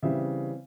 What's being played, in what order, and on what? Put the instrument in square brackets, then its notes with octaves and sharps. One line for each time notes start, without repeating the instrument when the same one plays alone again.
[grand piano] C#3 E3 G3 C4 E5